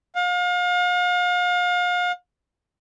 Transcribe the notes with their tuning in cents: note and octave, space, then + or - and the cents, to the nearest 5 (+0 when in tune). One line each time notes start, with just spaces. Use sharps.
F5 +35